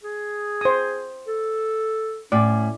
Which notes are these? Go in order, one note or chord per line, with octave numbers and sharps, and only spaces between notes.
G#4
C5 D#6
A4
A2 C#4 D5